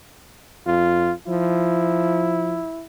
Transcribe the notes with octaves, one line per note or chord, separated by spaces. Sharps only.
F2 F4
F3 E4